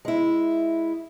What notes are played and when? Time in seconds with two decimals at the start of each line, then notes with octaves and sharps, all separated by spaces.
0.05 G#3 E4